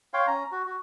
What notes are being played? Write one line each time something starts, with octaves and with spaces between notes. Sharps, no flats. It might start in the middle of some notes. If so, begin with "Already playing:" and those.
C#5 F5 G5 C6
C#4 A#5
F#4
F#4